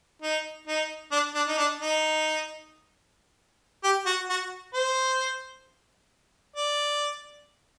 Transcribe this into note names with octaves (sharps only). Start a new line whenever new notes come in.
D#4
D#4
D4
D4
D#4
D4
D#4
G4
F#4
F#4
C5
D5